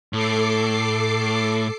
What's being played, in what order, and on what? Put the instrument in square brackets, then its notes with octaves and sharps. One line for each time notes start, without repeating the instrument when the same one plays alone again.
[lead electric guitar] A2 [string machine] A4 D6 C7